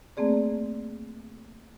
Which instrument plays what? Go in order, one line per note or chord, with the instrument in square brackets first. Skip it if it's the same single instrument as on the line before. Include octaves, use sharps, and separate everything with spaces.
[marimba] A3 A#3 C4 G#4 D5